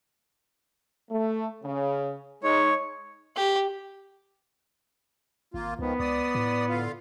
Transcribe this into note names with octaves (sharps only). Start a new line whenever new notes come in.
A3
C#3
G#3 D#4 C#5
G4
G#1 A#3 F4
C#2 D#3 F3 B3
C#2 D5 D#6
A2
D3 F4 F5